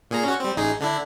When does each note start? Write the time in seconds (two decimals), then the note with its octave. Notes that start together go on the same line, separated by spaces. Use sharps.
0.11 A#2 G#4 A#5
0.24 C#4 F#4
0.40 G3 C4
0.56 A1 D#4 G#4
0.80 D3 D4 E4